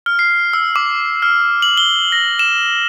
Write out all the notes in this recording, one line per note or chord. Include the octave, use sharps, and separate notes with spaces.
F6
C7
E6
D6
F6
F#7
G7
A#6
E7